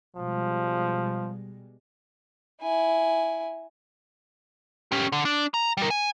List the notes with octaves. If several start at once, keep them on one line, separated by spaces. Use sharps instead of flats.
B2 F3 G3 G#3
E4 G#5
C#4 G4
D3
D4
A#5
G3 A#4
G#5